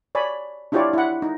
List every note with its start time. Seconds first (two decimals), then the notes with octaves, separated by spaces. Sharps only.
0.15 C#5 D5 G#5 B5
0.72 D4 E4 F4 G4 C#5 D5
0.93 E4 F#5
1.22 D#4